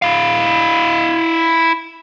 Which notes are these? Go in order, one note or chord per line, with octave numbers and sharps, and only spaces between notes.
E4 F5